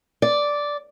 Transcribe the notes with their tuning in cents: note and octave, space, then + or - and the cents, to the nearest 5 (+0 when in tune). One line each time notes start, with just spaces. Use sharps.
D5 -5